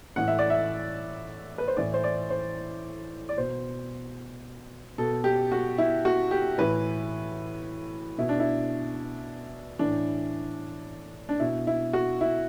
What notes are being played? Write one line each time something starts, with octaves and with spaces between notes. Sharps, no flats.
A2 E3 F#5
E5
D5
E5
B4
C5
A2 E3 D5
C5
D5
C5
D5
B2 C5
B2 A4
G4
F#4
E4
F#4
G4
A2 E3 B4
B2 E4
D4
E4
A2 E3 D4
D4
B2 E4
E4
F#4
E4